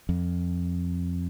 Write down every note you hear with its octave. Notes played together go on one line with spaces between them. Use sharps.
F2